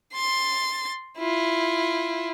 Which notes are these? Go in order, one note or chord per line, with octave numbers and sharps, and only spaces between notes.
C6 A6
E4 F4